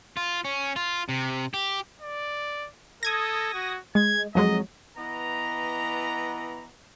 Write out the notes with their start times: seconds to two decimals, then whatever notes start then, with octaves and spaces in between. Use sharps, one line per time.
0.17 F4
0.45 C#4
0.76 F4
1.09 C3
1.54 G4
2.01 D5
3.03 A4 D#6 G#6 A#6
3.54 F#4
3.95 G#3 G#6
4.35 F2 F#3 G#3 D#5
4.97 E3 B3 D#5 A#5